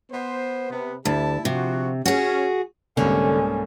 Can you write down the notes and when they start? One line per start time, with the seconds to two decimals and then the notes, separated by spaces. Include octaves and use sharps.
0.11 B3 C5
0.70 C3 B3
1.05 D2 E4 G4 A5
1.45 C3 F3 F#4
2.05 C#4 F#4 G#4
2.97 C2 G#2 D3 A#3 C#4